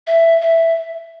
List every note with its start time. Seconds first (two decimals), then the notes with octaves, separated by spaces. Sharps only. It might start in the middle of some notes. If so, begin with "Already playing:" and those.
0.07 E5
0.41 E5